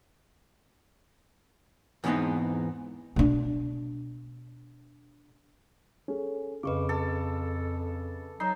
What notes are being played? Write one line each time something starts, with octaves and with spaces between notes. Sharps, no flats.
E2 G#2 E3 B3 C4 D#4
B2 D4
C#4 G#4 A4
F2 C#3 B4 D#5 C#6 D6
A4
F#3 D#4 C#5 A#5 C7